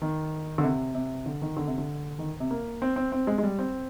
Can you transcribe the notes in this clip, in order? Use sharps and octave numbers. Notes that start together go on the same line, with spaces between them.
D#3
D3
C3
C3
D3
D#3
D3
C3
D3
D#3
C3
A#3
C4
C4
C4
G#3
G#3
G3
C4